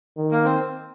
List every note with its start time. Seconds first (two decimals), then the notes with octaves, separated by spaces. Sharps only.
0.17 D#3
0.31 A#3
0.45 C4